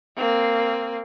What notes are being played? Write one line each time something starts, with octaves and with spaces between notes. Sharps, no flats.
A#3 C4